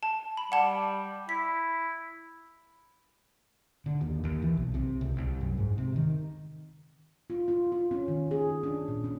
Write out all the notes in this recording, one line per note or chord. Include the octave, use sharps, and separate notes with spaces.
A5
B5
G3 F#5 A5
E4 B6
D3
D#2
D#2
E3
B1
C3
C#2
C2
F#2
G#2
C3
D#3
F4
F4
F4
C#4
D#3
G#4
D4
A#2
C#4